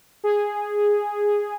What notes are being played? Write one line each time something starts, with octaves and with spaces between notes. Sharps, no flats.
G#4